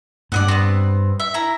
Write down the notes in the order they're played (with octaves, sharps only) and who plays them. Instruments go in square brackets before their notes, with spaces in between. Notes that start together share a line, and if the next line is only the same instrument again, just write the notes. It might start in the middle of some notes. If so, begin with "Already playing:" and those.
[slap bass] G2 [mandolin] D5 D#5 F#5
[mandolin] B3 C4
E5
E4 A#5